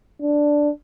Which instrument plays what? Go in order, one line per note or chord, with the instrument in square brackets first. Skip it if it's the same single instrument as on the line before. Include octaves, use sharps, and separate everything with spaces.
[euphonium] D4